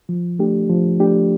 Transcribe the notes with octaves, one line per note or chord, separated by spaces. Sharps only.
F3
A3 D4 G4
F3
A3 D4 G4